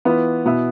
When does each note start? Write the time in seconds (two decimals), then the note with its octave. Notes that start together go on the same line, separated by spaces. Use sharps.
0.05 E3 B3 F4 B4
0.45 B2 B3 E4